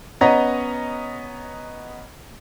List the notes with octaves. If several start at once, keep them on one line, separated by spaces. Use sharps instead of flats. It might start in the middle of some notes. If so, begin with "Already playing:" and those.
B3 C#4 C#5 D#5 A#5